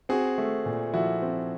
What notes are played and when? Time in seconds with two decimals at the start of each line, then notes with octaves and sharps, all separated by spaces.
0.09 C4 F#4 G#4
0.38 A3
0.66 A#2
0.94 F3 E4 F#4
1.22 C4